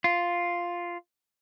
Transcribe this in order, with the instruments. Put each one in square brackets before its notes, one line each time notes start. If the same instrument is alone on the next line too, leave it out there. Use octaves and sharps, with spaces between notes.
[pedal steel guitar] F4